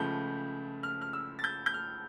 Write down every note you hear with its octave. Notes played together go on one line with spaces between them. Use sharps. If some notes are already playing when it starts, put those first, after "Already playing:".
Already playing: C#2 C#3 F3 A3 G6
F6
F6
E6
A6
G6
G6
F6